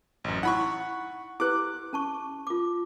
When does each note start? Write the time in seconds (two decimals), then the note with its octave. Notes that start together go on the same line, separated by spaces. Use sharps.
0.24 A1 F#2
0.43 D#4 E4 F#5 B5 C#6
1.40 E4 G4 B4 D6 F#6
1.93 C#4 A5 C#6
2.47 F4 D6